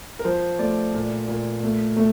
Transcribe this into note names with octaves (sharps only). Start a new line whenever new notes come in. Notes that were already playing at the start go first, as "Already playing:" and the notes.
A#4
F3 C5
A3 D5
A#2
A#2
A3
A3